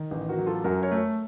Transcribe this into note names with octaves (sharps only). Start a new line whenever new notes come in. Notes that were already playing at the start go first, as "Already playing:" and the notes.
Already playing: D#3
A1
F#4 A#4
F#3
F4 A4
F#2 F#4 A#4
A#4 C#5
A3